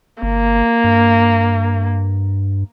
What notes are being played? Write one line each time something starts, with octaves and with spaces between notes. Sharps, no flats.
G1 A#3
G2